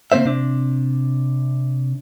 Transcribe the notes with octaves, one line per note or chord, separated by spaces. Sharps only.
C#3 A#3 C4 C5 E5
C3 D4